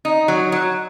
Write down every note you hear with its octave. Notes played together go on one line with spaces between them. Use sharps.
D#4
F#3
F#3